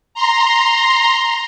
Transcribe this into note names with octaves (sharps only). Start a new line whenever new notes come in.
A#5 C6